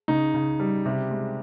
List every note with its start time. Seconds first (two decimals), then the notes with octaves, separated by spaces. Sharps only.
0.08 C#3 D#4
0.34 C#3
0.60 G3
0.85 C3
1.11 G#3